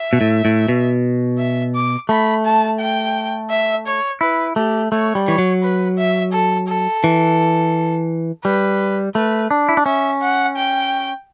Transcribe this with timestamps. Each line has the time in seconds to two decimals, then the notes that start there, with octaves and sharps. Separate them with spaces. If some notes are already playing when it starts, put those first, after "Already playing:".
Already playing: E5
0.13 B2
0.21 A2
0.45 A2
0.68 B2
1.38 E5
1.75 D6
2.09 A3 B5
2.45 A5
2.79 G5
3.50 E5
3.86 C#5
4.21 E4 B4
4.56 A3 G4
4.92 A3 C#5
5.15 G3
5.27 E3 C#5
5.38 F#3
5.62 B4
5.98 E5
6.32 A4
6.68 A4
7.04 E3
8.44 G3 B4
9.15 A3 B4
9.51 D4
9.69 E4
9.77 D4
9.85 C#4 E5
10.21 F#5
10.57 G5